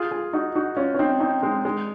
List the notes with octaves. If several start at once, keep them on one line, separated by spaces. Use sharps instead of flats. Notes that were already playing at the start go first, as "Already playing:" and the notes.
Already playing: F4 G#4
F4 G#4
D#4 F#4
D#4 F#4
C#4 F4
C#4
C4 D#4
C4 D#4
G#3 C4
G#3